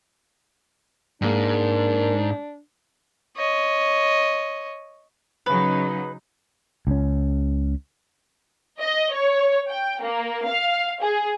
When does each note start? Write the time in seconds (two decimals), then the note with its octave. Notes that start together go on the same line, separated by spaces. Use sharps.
1.22 G#2 G#3 A#3 D4
3.37 C#5 D#5
5.46 C#3 F#3 D#4 B4
6.87 C#2 C#4
8.81 D#5
9.13 C#5
9.69 G5
10.02 A#3
10.47 F5
11.01 G#4